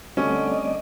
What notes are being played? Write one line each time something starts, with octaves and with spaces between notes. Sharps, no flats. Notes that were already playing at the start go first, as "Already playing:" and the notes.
D3 G3 A3 C4 C#4 D5 D#5